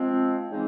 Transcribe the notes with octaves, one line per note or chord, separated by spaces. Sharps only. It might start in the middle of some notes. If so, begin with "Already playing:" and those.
Already playing: F3 G#3 C4
C#3 E3 G#3 C4 D#4